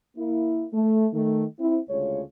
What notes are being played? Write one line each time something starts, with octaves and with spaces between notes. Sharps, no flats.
A#3 E4
A3
D#3 A3
C4 E4
D2 C#3 G#3 F4 C#5